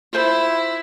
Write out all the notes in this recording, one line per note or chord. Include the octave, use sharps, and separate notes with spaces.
E4 F4 C5